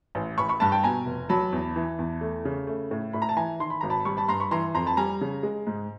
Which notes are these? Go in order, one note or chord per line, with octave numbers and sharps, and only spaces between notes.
A1
A1 B5 C#6
B5 C#6
G2 A5 B5
G5 A5
B2 G#5 A#5
F1
F#3 A5 B5
E2
E3
E2
A3
C#3
A3
A2
A2 B5
A#5
A5
E3 G#5 A#5
D#3 C6
B5
G#1 A#5
A5 B5
G3 B5 C#6
A5 B5
G2 A#5 C6
B5 C#6
E3 A#5 C6
F2 A#5 C6
A5 B5
G3 G#5 A#5
C#3
G#3
G#2